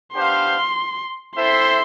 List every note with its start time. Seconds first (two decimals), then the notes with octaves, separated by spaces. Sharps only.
0.14 B3 D4 G4 C5 F5 C6
1.36 C4 E4 A4 C5 E5 C6